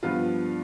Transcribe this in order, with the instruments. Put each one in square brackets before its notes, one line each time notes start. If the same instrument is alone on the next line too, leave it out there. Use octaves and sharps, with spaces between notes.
[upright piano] G2 F3 B3 F4